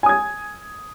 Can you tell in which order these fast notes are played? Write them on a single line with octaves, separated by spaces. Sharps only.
G#5 D#6 G#6